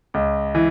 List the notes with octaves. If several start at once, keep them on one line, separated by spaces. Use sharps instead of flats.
C#2
E3